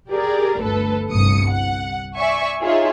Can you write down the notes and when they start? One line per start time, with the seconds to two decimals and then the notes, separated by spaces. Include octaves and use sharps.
0.11 G4 G#4 A#4 D5
0.60 G1 D2 A4 B4
1.13 G1 C2 G2 D#6 C#7
1.49 F#5
2.17 D5 E5 G#5 C#6
2.62 D#4 F4 G#4 C#5 E5